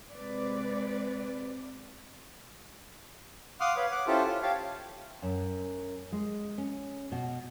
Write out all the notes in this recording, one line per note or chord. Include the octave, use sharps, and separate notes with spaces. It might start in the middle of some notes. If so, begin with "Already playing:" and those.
C3 G#3 C4 B4 D5
F5 F#5 C6 D6 D#6 F6
B4 C#5 F5
F#5 D6
C#4 E4 F4 G4 A4 C5
F4
G4 C#5 F5 A5
F#2
G#3
C#4
B2